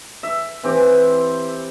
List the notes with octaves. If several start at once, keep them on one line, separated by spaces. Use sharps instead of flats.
E5
E3 C4 G4